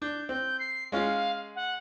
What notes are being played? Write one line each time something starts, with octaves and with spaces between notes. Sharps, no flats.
D4 G6
C4 G6
C7
G#3 C#4 F4 F5
F#5